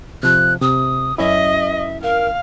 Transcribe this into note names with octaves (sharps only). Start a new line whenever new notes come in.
C3 F3 F#6
C3 D#6
F#2 C#4 E4 D#5 E5
A#4 F5